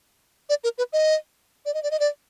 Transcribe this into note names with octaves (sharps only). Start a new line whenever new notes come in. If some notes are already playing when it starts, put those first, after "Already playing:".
D5
A#4
B4
D#5
D5
D#5
D5
D#5
D5